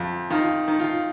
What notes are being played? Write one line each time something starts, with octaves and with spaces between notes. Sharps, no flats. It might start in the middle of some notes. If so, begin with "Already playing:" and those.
Already playing: F2
D#3 F4
D#3
F4